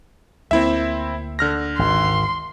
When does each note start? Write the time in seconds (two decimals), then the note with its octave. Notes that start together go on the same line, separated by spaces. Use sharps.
0.51 D2 A#3 C4 E4 E5
1.39 D3 F6 A#6
1.79 G#1 C6